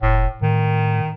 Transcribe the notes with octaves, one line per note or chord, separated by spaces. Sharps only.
F1 A2
A2 D#3